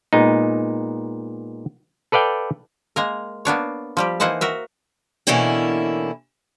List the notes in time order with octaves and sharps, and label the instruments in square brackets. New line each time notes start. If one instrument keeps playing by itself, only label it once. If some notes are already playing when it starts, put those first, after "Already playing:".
[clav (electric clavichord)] A#2 G#3 B3 D#4
A4 B4 D5 F5 G5
[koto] G#3 A#3 A#4
A#3 B3 D4 C#5
F3 G3 G4
E3 A#3 D#4 C5 F#5 A5
F#4 A#4 E5
[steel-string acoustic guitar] B2 D3 E3 A#3 C#4 E4